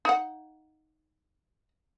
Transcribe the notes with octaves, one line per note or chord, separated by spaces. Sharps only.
D#4 F#5